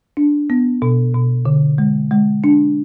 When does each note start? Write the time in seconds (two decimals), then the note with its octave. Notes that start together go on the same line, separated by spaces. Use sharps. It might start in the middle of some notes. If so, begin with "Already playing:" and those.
0.17 D4
0.50 B3
0.82 B2
1.14 B2
1.45 D3
1.78 G#3
2.11 G#3
2.44 D4